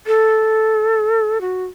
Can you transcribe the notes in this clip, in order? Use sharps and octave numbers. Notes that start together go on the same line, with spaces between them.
A4
F#4